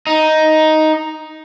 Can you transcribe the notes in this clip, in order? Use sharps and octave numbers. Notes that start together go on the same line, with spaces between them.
D#4